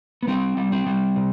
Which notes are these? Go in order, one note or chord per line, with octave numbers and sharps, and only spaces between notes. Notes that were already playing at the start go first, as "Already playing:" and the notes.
B3
G3 C4
G3
C4
G3
C3